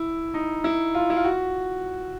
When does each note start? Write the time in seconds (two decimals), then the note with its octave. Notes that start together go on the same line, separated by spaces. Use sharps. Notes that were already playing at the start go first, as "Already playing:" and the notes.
Already playing: E4
0.34 D#4
0.64 E4
0.94 F4
1.10 E4
1.17 F4
1.24 F#4